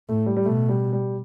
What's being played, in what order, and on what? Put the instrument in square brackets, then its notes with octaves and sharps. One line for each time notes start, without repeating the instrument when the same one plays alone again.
[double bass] A2 [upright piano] A3
[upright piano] G3
G3
[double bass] B2 [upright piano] A3
[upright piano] G3
G3